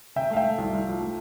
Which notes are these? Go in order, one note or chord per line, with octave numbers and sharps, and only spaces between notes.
C3 E5 G5
A3 F5
E5 G5
A3
C2
C2
F3
A3